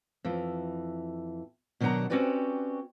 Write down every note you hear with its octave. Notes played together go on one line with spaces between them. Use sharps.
F2 E3
B2 D#3 F#3 D4 F#5 A#5
C4 C#4 F#4 G4 B4 D5